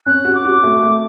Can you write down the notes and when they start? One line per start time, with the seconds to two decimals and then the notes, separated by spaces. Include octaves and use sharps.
0.06 C#4 F#6
0.25 F#4
0.35 D6
0.45 F#4
0.64 A3
0.83 A3